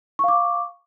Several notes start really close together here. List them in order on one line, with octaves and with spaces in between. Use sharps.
C#6 F5 D6